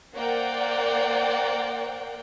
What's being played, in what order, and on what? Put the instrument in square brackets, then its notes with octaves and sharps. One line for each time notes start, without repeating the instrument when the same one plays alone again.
[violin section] A#3 A#4 C5 D5 F#5 G5